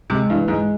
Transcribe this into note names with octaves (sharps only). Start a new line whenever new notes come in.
C3 G#3
G2 E3
G#2 G#3